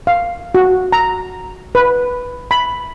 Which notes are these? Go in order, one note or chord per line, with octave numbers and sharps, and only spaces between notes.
F5
F#4
A#5
B4
B5